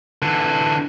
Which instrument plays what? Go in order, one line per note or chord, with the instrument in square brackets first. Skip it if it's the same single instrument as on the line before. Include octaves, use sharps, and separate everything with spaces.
[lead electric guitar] D3 E3